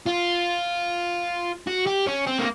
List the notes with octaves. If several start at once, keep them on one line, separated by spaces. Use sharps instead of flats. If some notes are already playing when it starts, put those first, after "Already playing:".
F4
F#4
G4
C#4
C4
A#3